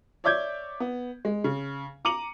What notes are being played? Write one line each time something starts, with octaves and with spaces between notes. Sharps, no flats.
C#5 D5 E5 D6 G6 G#6
B3
G#3
C#3
A#5 D6 C#7 D#7 F#7